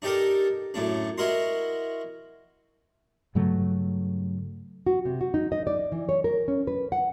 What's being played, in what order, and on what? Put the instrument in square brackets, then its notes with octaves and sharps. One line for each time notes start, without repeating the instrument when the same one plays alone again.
[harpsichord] D4 D#4 G4 A4 A#4
F#2 A2 D4
E4 F#4 A#4 D#5 C6
[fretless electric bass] G2 C#3 F#3 A3
[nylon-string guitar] F#4
C3
F#4
D#4
D#5
D5
E3
C#5
A#4
C#4
B4
F#5